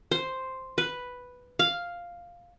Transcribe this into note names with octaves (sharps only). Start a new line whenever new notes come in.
C5
B4
F5